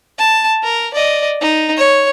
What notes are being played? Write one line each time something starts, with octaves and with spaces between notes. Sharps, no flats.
A5
A#4
D5 D#5
D#4
C#5